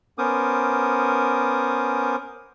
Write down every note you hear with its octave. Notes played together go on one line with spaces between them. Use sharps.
B3 C#4 A#4 C5 D6 D#6